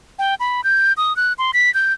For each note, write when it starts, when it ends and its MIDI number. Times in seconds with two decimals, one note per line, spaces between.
0.19 0.35 79
0.40 0.64 83
0.64 0.93 91
0.97 1.15 87
1.16 1.33 90
1.38 1.51 84
1.54 1.73 95
1.74 1.93 91